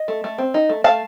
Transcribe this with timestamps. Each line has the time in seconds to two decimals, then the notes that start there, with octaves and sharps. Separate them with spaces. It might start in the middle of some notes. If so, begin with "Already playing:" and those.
Already playing: D#5
0.08 A3
0.24 A3
0.38 C4
0.54 D#4
0.69 A3
0.84 A3 F5 A5